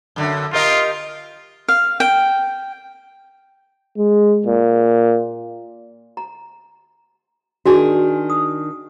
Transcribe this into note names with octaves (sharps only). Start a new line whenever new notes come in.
F#2 D3
F4 G4 A#4 D#5
F5
G5
G#3
A#2
A#5
D#3 D4 F#4 G#4
D#6